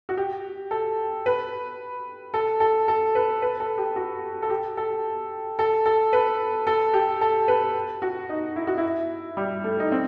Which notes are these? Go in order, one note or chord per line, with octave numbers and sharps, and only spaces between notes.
F#4
G4
A4
B4
A4
A4
A4
B4
B4
A4
G4
F#4
A4
G4
A4
A4
A4
B4
A4
G4
A4
B4
F#4
D#4
E4
F#4
E4
G3
A3
D#4
C4